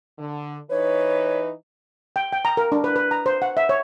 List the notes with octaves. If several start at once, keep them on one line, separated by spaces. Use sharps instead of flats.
D3
E3 D#4 B4 C#5
G5
G5
A#5
A#4
D4
B4
B4
A#5
C5
F#5
E5
C#5